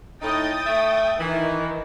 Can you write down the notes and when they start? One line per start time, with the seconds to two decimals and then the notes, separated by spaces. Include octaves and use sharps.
0.22 A2 D#4 G5 D#6 A6
0.67 A3 E5
1.20 D#3 E3